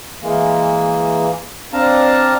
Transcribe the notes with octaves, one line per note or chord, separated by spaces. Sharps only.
E3 G#3 A#3
C4 D4 F5 A5 A#5